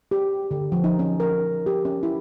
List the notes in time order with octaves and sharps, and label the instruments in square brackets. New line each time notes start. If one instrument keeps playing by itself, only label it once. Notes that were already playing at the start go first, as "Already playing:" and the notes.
[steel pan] G4
D3
F3
D#4
C#4
A#4
G4
C#4
E4